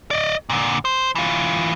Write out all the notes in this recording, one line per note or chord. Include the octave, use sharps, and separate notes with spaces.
D5 D#5
A#2 D3
C5
E3 F4